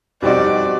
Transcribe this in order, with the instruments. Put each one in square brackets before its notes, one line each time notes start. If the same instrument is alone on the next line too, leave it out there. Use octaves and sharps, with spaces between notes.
[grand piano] B2 G3 C4 D#4 F#4 [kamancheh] D5